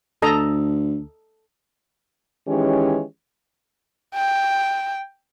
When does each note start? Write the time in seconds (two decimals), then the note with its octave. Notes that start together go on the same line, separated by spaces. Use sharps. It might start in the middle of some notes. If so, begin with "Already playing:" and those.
0.22 D2 A4 D#5 A#5
2.48 D#3 E3 G#3 C#4 G4 C#5
4.15 G5